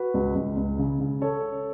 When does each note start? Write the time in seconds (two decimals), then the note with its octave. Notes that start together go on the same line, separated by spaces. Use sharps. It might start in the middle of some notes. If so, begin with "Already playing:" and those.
Already playing: F#4 B4
0.14 C#2
0.35 C#2
0.57 C#2
0.79 C#3
1.00 C#3
1.22 A4 C#5